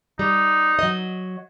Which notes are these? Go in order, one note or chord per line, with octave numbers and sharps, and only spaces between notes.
G3 D#4
F#3 D#5